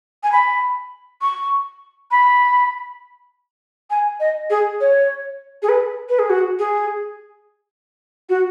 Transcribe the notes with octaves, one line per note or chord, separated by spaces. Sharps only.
G#5
B5
C#6
B5
G#5
D#5
G#4
C#5
G#4
B4
B4
G#4
F#4
G#4
F#4